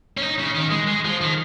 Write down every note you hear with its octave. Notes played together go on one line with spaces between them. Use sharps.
C#4
D#4
C#3
D#3
G#3
G#3
F3
D#3